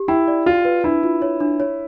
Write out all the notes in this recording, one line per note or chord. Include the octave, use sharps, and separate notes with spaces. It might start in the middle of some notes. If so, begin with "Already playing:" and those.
Already playing: G4
E4 G5
D5
F4 F#4
B4
D4 E4
F4
C#5
D4
C#5